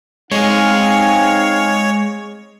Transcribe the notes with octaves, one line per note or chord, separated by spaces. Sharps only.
G#3 C4 D#4 G#4 C#5 F5